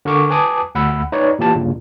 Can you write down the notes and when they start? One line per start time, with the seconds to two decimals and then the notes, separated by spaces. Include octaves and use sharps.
0.05 D3 A#4 C#6 D6
0.30 B4 G#5 A5 D6 D#6
0.75 D2 F#5 B5 E6
1.12 D#4 B4 C#5 D5
1.39 A#2 E3 G4 A5
1.55 B1 G2 A#2 C#3